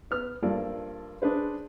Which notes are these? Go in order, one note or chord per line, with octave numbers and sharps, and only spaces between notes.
B3 F6
G2 F3 A#3 A4 D5
D4 G#4 B4 C5